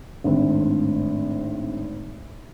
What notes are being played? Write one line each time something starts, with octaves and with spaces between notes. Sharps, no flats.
G#1 A2 D3 C4